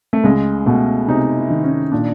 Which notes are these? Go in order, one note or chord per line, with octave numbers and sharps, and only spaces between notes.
A3
C#2 G#3
B2 A3
C3 D#4
E4
D#3
C#4
A#2 D4